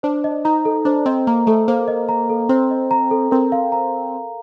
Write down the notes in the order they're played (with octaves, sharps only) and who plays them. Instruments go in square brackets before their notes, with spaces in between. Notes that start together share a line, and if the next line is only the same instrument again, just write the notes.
[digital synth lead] D4 [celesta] C5
[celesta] D#5
[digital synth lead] D#4 [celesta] A#5
[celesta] A4
[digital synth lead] D4 [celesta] C5
[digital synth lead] C4 [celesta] D#5
[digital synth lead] A#3 [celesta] A#5
[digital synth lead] A3 [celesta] A4
[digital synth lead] A#3 [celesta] C5
[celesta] D#5
A#5
A4
[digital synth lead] C4 [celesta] C5
[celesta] D#5
A#5
A4
[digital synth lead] C4 [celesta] A#4
[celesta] F5
A#5